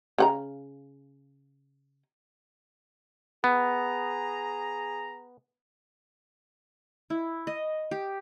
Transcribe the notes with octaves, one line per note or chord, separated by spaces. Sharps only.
C#3 F#5 A#5
B3 G#4 A#5
E4
D#5
G4